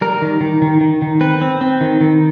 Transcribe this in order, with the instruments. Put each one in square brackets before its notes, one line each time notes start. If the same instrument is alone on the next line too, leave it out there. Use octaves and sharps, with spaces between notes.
[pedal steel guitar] G3 A#4
D#3
D#3
D#3
D#3
D#3
C4 B4
C4
C4
D#3
D#3